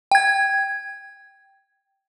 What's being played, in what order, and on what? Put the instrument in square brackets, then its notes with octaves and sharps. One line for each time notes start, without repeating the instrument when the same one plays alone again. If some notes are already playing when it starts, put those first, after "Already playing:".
[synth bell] G5 G#6